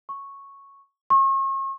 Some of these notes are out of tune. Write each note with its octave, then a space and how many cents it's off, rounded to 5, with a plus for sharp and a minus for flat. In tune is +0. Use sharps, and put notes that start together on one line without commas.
C#6 -5
C#6 -40